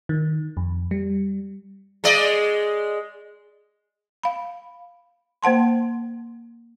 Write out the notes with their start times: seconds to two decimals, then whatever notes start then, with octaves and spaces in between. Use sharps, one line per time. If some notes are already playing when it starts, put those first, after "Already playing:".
0.09 D#3
0.57 F2
0.91 G3
2.04 G#3 D5 D#5
4.23 F5 B5
5.43 A#3 C5 F#5 A5 C6